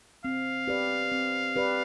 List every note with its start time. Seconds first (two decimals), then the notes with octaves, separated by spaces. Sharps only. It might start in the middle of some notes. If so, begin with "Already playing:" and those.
0.25 C4 F5
0.67 G4 B4 D5
1.12 C4
1.56 G4 B4 D5